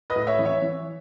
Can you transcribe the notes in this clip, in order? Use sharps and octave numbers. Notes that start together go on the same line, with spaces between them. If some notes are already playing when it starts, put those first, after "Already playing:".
B4 D#5
A2
C#5 E5
E3
C#5 E5
E3